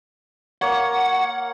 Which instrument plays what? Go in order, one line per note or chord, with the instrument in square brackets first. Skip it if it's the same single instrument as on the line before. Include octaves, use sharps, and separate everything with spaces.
[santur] A#3 C#5 [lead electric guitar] F#5